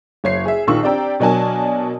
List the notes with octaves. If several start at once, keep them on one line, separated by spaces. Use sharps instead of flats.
F#1 C#5 C7
G#4 E5
A#1 D#3 F4 C#6 E6
C4 D4 G4 D5 G5 A#5
B2 F#3 D4 A#4 G#5 A5